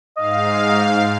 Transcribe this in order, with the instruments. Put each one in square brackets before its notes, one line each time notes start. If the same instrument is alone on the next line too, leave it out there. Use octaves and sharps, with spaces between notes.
[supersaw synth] G#2 F5 [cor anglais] D#5